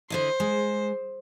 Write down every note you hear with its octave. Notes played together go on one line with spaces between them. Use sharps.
D3 E4 C5 D#5
G#3